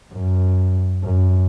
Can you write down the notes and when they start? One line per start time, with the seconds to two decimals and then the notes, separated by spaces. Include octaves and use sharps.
0.13 F#2
1.04 F#2